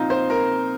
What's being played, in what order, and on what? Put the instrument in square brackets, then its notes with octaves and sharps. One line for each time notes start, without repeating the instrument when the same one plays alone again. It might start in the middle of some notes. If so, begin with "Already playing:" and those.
Already playing: [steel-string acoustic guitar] A#2 F3 C4 [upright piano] D#4 F4
[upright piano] C5
A#4